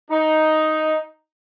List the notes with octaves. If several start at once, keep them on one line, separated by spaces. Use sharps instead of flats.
D#4